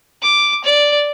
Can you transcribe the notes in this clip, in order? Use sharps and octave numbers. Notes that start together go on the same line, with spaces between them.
D6
D5